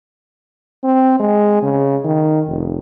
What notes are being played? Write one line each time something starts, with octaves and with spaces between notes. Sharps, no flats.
C4
G#3
C#3
D#3
F1